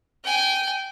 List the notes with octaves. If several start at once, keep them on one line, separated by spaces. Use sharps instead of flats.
G5 G#5